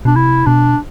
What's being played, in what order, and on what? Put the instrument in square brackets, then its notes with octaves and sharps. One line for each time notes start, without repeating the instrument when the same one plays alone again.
[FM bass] B2 [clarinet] D4
[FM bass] C3 [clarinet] E4
[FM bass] B2 [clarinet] D4